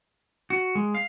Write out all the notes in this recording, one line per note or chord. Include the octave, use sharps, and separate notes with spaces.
F#4
G#3
F5